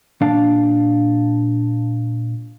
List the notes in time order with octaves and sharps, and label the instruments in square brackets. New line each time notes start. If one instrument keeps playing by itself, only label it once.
[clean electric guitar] A#2 D4 D5 F5